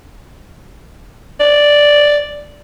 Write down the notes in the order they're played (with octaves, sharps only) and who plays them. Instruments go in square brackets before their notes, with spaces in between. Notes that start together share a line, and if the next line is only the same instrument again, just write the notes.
[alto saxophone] D5